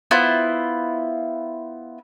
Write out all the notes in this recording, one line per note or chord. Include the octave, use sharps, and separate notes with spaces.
B3 E4 F4 C5